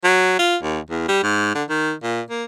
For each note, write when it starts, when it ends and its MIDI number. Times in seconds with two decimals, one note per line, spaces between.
0.04 0.38 54
0.39 0.56 65
0.63 0.79 39
0.90 1.05 40
1.08 1.19 55
1.23 1.54 44
1.55 1.64 50
1.69 1.93 51
2.03 2.21 46
2.30 2.44 58